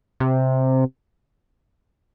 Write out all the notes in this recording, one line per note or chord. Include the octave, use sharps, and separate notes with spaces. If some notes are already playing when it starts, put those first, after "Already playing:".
C3